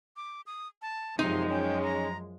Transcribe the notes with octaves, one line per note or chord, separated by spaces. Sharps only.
D6
D#6
A5
F#2 C3 F3 G#3 D#4 C6
C#4 G5
A#5